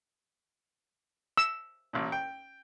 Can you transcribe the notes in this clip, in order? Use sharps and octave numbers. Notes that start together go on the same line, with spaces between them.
E6
A1 A#2
G5